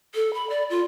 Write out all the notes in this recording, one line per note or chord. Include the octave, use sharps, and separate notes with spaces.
A4
B5
D5
F4